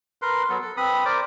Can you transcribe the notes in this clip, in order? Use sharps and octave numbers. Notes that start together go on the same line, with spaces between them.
A#4 B4 C6
F#3 B3 A4
A4
C4 B4 B5 D#6
A#4 C5 D5 D6